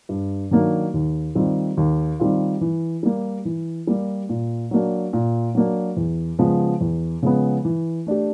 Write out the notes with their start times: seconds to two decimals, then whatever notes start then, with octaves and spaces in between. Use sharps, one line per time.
0.09 G2
0.51 D#3 F#3 A#3 D4
0.94 D#2
1.35 D#3 G3 C4 F4
1.77 D#2
2.20 D#3 G3 C4 F4
2.61 E3
3.03 G3 A#3
3.45 E3
3.87 G3 A#3
4.29 A#2
4.71 F#3 A#3 D4
5.13 A#2
5.55 F#3 A#3 D4
5.97 E2
6.39 C#3 F3 G#3 B3
6.81 E2
7.23 C#3 F3 G#3 B3
7.65 E3
8.07 A3 D4 G4